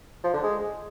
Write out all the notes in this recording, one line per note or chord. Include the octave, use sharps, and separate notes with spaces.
F3
D3
G#3